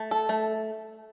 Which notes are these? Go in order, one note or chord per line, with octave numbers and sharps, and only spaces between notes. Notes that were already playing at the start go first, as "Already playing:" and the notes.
Already playing: A3
A4
A3